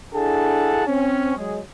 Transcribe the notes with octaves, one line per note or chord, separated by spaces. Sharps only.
D4 E4 G#4 A4 F#5 A5
C4 C#4
F#3 G#3 G#4